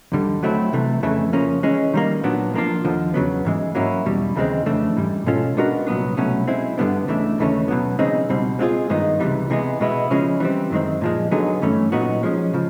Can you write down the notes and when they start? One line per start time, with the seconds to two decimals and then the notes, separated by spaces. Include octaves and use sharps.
0.12 D#2 D3 G3
0.43 F#3 A3 C4 E4
0.72 C2 C3 E3 A3
1.03 F2 C#3 E3 A3
1.33 C#3 F3 A#3 C#4
1.63 E3 G#3 C#4
1.94 D#3 G3 A#3
2.23 A#2 F#3 B3 D4
2.54 F3 A#3 D4 F4
2.84 D#2 D3 F3
3.14 E2 C#3 F#3 B3
3.45 G#2 E3 G#3
3.75 F#3 A#3 C#4 E4
4.06 E2 B2 G3
4.36 D#2 C#3 E3 G#3 C4
4.66 F2 C#3 E3 A3 D4
4.96 G#2 E3 G3
5.26 B2 G#3 C#4 F4 A4
5.57 G#3 B3 D4 F#4 A#4
5.87 C2 A#2 F#3 B3 D4
6.17 C2 B2 F#3 A3 C#4
6.47 G#3 C4 E4
6.78 G2 D3 G3 B3 D4
7.08 C#2 C#3 E3 A3 D4
7.38 D#2 C#3 E3 A3 C#4
7.68 B2 F#3 B3
7.99 C#3 E3 G#3 C4 D#4
8.29 C#2 B2 G3 C4
8.59 G#3 C4 F4 G#4
8.90 G2 D#3 G#3 B3 D#4
9.20 C#2 C3 E3 G3
9.50 C3 E3 G#3 B3
9.81 B2 G#3 B3 E4
10.11 C#3 F3 G#3 C#4
10.40 E3 G3 C4
10.71 F#2 D#3 G#3 C4
11.01 A#2 F3 G#3
11.31 D3 F#3 B3 D#4 G#4
11.62 G2 E3 A3 C#4
11.92 A#2 F#3 B3 D#4 F#4
12.23 F3 G#3 C#4
12.54 C#3 F3